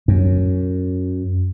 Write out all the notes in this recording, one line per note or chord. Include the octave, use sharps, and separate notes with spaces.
F#2